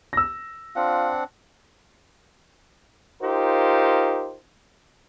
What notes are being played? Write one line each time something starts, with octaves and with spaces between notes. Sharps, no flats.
E6 A#6
C4 D4 F4 F#5
D#4 F4 G4 A#4 C5